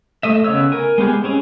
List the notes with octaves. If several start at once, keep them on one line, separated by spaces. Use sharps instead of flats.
A3 D#5 E5
C#3 B3 C#5 E6
A#4 G#5
G#3 B3 G4 G#4
C4 C#4 G#4